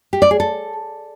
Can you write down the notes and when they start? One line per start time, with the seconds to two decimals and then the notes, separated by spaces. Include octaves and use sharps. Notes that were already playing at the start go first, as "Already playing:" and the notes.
0.13 G4
0.22 D5
0.31 G#4
0.40 A4